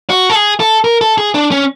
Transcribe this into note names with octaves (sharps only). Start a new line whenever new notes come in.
F#4
A4
G#4
A4
A#4
A4
G#4
D4
C#4